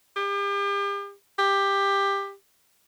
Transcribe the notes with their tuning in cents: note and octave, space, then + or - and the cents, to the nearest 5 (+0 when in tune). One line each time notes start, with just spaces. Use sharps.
G4 +40
G4 +15